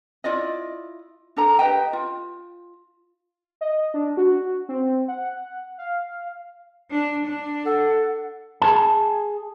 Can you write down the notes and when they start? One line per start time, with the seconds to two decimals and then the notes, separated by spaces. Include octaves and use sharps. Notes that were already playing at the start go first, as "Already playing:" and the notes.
0.24 E4 F4 D5 D#5
1.36 D4 A4 A#5
1.59 G4 B4 D#5 G5
1.93 F4
3.61 D#5
3.94 D4
4.17 F#4
4.69 C4
5.08 F#5
5.78 F5
6.91 D4
7.26 D4
7.66 A4 F#5
8.62 G#4 A5